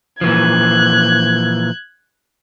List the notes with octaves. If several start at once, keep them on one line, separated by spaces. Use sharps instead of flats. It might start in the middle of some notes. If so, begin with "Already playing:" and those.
A#2 E3 F3 F#6 G#6